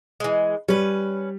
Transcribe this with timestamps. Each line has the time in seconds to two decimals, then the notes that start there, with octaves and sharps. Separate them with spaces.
0.20 E3 G#3
0.68 G3 C#4 B4